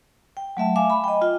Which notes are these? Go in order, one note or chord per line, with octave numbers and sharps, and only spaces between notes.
G5
F#3 A3 E5 A5
E5 F5 G#5 D6
B5
D#5 G5
F4 G5